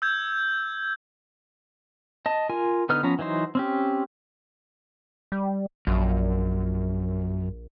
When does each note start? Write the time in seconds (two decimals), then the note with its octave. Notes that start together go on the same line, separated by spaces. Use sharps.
0.02 E6 G6 G#6
2.26 D#5 A5
2.49 F4 A#4 G#5
2.89 D3 B3 D#4 B4 F6
3.03 F3 B3 C#4 A#5
3.19 E3 F#3 D#4 C5
3.55 C4 C#4 G4
5.32 G3
5.87 A#1 F#2